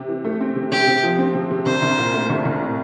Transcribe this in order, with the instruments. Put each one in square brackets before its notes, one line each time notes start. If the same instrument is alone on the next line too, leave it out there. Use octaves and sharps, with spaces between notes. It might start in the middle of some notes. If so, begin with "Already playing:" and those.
Already playing: [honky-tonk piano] C3
E3
A3
C4
C3
[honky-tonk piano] C3 [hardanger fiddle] G4
[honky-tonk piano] C3
F3
C4
C3
C3
[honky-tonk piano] C2 [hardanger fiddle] C5
[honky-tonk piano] C2
A#2
A3
C2
C2
A2